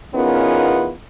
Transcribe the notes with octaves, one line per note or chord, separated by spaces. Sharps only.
E2 B3 C#4 D#4 F4 A#4